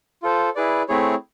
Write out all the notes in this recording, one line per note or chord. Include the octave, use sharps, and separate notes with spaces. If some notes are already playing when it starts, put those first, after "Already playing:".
F4 A4 C5
E4 G#4 B4 D5
A3 C4 E4 G#4 C#5